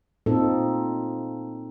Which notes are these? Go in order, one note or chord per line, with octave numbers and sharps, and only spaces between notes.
A#2 C4 D#4 F4 A4